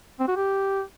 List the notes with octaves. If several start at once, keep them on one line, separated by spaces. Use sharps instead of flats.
C4
F#4
G4